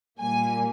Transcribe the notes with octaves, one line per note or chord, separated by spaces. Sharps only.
A#2 G3 A#3 G#5